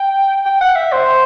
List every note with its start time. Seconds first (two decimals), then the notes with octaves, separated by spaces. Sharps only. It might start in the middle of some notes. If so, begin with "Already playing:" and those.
Already playing: G5
0.45 G5
0.61 F#5
0.76 E5
0.92 C5